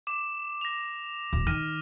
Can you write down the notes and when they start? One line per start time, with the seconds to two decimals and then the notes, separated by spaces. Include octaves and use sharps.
0.07 D6 E7
0.61 A#6 F7
1.33 D1
1.47 D#3 F6 A#6 D#7